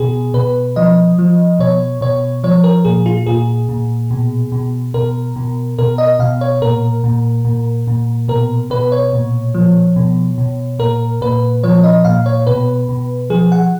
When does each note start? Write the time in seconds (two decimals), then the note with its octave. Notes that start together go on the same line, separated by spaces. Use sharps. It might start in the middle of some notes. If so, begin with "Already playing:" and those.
Already playing: B2 G#4
0.34 B2 B4
0.76 F3 D#5
1.19 F3
1.59 B2 C#5
2.01 B2 C#5
2.44 F3 C#5
2.64 A#4
2.85 A#2 G#4
3.06 F4
3.26 A#2 G#4
3.69 A#2
4.11 B2
4.52 B2
4.94 B2 A#4
5.36 B2
5.79 B2 A#4
5.98 D#5
6.19 B2 F5
6.41 C#5
6.62 A#2 A#4
7.04 A#2
7.45 A#2
7.87 A#2
8.28 B2 A#4
8.70 B2 B4
8.92 C#5
9.13 A#2
9.54 F3
9.96 B2
10.38 B2
10.79 A#2 A#4
11.21 A#2 B4
11.63 F3 C#5
11.84 D#5
12.04 A#2 F5
12.26 C#5
12.47 B2 B4
12.89 B2
13.30 F3 G#4
13.52 F#5